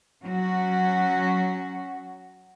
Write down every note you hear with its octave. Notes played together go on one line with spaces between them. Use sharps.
F#3 C#4 F#4